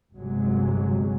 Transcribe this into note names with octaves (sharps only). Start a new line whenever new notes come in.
G1 C3 F#3 G#3